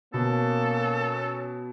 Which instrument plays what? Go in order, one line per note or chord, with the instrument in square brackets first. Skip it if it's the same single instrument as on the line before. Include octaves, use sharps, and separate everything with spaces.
[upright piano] B2 [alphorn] A#3 [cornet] C#4 [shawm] A4